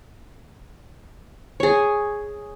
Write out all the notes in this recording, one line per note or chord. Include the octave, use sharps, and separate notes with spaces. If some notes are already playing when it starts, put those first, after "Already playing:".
G#4 C#5